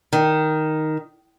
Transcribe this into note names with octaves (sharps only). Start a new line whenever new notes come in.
D#3